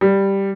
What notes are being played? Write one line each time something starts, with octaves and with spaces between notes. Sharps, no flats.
G3